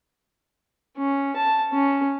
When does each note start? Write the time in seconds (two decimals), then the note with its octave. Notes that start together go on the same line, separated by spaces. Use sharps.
0.97 C#4
1.36 A5
1.73 C#4